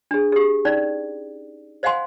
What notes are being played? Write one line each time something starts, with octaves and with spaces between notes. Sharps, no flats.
D4 G#4
G4 G#4
C#4 D#4 D5
C5 D#5 F5 F#5 G#5 C6